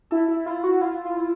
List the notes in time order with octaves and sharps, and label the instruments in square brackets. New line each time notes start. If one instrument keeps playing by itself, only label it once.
[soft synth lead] E4 [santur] A4
[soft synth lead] E4
[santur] E4 [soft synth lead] F4
[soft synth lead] F#4
[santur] E4 [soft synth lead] F4
[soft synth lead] F4
[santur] E4